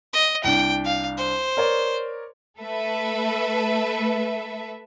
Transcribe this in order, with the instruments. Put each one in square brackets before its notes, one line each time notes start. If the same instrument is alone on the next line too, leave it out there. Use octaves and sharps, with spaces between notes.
[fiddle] D#5
[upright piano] C2 D4 [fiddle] G5
[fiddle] F5
C5
[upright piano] A#4 C#5 D5
[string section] A3 A4 B4 E5